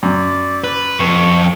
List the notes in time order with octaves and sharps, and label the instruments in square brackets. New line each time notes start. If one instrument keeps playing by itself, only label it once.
[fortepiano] F#2 [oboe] D5
[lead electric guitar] B4
[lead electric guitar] F2 [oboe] C#6